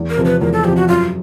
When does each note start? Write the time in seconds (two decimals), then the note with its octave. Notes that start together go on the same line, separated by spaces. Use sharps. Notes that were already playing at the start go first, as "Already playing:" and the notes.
Already playing: E2
0.10 A#4
0.17 C3 F3
0.25 B4
0.41 E2 A#4
0.53 A4
0.64 C3 F3 G4
0.76 F#4
0.88 F#2 F4